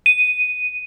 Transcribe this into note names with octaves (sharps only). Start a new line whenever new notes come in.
D#7